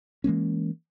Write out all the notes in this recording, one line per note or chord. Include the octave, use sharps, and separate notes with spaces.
E3 G#3 A#3 C#4